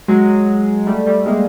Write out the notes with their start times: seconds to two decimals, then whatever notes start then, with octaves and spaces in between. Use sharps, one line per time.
0.08 F#3 G#3
0.87 G3 A3
1.06 G3 A3
1.26 G#3 A#3